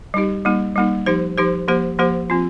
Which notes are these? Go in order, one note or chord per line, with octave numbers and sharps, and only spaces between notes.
G3 D#4 G4
G3 A#3 D#4
G3 A#3 D#4
F3 D#4 G4 C5
F3 D#4 G4 C5
F3 A#3 G4 C5
F3 A#3 G4 C5
F3 C4 F4